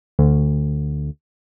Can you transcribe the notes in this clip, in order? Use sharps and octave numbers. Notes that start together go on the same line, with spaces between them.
D2